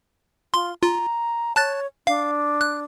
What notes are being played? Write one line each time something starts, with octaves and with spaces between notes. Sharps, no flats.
F4 C6
F4 A#5
C#5 A5 F#6 A6
D4 F5
F#6